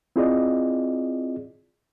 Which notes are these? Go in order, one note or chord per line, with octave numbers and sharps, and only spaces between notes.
C4 E4 F4 G#4 D5 D#5